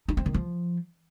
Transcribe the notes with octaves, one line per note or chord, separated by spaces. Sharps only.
D#4
C4
D#3
F3